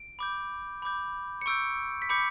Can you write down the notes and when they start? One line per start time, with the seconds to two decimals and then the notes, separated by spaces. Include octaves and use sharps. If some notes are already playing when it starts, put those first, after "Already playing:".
Already playing: D7
0.19 B5 D6 G6
0.82 B5 D6 G6
1.41 C#7
1.46 C#6 E6 G6 D7
2.02 B6
2.09 B5 D6 G6 C#7